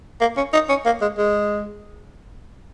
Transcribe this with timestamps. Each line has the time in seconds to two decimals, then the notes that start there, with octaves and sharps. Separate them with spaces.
0.21 A#3
0.37 C#4
0.53 D#4
0.69 C#4
0.86 A#3
1.02 G#3
1.18 G#3